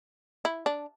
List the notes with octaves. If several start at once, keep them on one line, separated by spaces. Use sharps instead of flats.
E4
D4